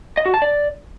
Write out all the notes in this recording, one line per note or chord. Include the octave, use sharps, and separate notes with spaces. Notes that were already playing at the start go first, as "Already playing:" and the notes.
D#5
F#4
A5
D5